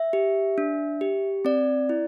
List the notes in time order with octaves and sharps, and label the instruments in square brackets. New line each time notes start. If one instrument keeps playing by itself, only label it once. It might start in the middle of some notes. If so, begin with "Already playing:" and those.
Already playing: [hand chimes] E5
G4
D4
G4
C4 D5
E4